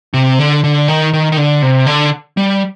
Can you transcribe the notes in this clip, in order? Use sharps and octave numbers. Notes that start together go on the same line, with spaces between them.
C3
D3
D3
D#3
D#3
D#3
D3
C3
D3
G3